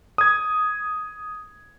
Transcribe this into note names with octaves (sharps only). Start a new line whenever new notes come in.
D#6 G#6